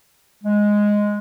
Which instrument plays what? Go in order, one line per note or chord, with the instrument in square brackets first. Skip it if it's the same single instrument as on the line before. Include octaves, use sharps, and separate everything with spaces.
[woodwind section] G#3